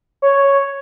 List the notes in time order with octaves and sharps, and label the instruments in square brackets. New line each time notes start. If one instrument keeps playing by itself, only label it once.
[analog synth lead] C#5